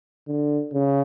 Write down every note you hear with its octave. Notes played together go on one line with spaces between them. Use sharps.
D3
C#3